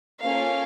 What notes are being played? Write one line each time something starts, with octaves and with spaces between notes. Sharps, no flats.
A#3 C#4 F4 A4 F5